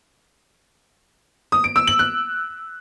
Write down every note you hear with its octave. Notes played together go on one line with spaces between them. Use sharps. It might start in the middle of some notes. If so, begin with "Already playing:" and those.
D#6
D7
E6
F#7
F#6